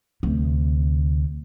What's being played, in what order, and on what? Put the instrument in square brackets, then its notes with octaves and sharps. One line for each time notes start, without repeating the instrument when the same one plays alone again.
[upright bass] D2 C3